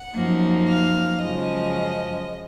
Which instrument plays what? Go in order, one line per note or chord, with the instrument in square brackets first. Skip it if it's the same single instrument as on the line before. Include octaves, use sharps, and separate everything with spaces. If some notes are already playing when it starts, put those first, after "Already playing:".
Already playing: [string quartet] F#5
F#2 F3 A#3 D#4
F5
F#2 C#3 F3 G#3 D#5